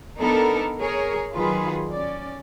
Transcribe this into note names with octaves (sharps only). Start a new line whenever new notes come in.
B3 D4 D#4 A4 A#4
G#4 A#4 C#5
D#3 F#3 F4 G#4 B4
C#4 D5